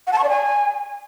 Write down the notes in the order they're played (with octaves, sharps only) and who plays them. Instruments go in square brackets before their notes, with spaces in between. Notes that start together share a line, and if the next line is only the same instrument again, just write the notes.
[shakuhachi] F#5
A5
C#6
D5
G#5